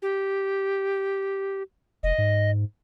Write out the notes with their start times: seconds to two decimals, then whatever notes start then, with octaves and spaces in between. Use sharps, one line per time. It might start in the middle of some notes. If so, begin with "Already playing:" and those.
0.02 G4
2.03 F1 D#5
2.18 G#2